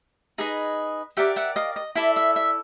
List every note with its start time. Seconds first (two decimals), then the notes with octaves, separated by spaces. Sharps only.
0.38 D#4 G#4 B4 D#5
1.17 G4 A#4 D5 E5 F#5
1.36 E5 F#5
1.56 D#5 F5
1.76 D#5
1.95 E4 A4 D5 E5
2.16 E5
2.36 E5